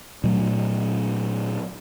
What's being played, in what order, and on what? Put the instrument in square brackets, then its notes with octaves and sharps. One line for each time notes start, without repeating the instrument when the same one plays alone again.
[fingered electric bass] A#2 F#3 A3